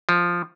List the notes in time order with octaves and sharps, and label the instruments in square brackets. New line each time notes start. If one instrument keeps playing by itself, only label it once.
[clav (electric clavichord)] F3